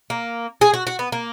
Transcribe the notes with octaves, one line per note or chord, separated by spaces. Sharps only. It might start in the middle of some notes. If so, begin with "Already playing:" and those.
A#3
G#4
F#4
F#4
B3
A#3